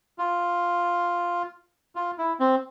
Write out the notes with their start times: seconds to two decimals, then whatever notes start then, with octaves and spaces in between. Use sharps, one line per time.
0.19 F4
1.96 F4
2.18 E4
2.40 C4